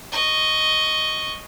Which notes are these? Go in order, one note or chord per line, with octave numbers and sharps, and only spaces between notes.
D#5 C#6